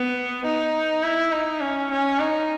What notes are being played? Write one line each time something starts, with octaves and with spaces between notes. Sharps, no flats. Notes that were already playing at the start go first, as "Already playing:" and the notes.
Already playing: B3
D#4
E4
D#4
C#4
C#4
D#4